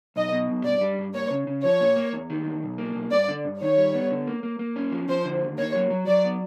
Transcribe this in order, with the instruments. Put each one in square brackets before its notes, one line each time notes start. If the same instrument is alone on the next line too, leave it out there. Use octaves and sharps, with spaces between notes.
[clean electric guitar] B1 [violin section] D#5
[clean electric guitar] B2
B1
[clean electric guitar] G2 [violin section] D5
[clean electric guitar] G3
G2
[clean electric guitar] A#3 [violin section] C#5
[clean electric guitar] C#3
C#3
[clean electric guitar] F3 [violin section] C#5
[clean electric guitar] A#2
A#3
E2
D#3
E2
B1
A#3
B1
[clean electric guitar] G2 [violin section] D5
[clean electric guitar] D3
G2
[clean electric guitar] D#3 [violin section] C#5
[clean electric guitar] G3
B3
D3
A#3
A#3
A#3
C#4
F3
[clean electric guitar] F3 [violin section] C5
[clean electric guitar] D3
D#2
[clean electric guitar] A#3 [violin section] C#5
[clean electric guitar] F#3
F#3
[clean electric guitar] F#3 [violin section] D5
[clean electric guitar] B3